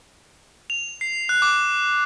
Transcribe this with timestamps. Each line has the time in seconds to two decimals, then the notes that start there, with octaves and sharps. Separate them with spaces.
0.70 F7
1.01 C7
1.29 F#6
1.42 D6